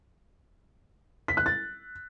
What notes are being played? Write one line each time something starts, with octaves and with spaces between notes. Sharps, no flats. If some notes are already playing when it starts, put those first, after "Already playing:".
B6
F#6
A6